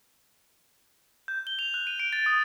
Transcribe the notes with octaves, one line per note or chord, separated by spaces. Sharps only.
G6
G7
F7
F#6
D#7
D7
A6
D#6